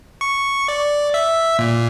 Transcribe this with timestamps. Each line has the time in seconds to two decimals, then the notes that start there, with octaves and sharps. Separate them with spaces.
0.21 C#6
0.68 D5
1.14 E5
1.59 A#2